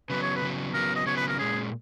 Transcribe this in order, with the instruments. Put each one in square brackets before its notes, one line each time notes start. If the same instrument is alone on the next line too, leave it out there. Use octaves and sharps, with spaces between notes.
[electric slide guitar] C#3 F#3 B3 [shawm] B4
[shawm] C#5
B4
[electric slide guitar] C#3 F#3 B3
[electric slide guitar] C#3 F#3 B3 [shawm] A#4
[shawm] D#5
[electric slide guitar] C#3 F#3 B3 [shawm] C#5
[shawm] B4
A#4
[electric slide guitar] A#2 G#3 C#4 [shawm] G#4